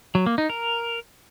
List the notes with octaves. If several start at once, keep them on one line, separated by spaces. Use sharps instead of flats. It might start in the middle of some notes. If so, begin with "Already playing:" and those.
F#3
A#3
D#4
A#4